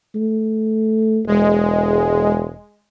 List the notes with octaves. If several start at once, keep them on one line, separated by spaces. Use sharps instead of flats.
A3
E1 G#3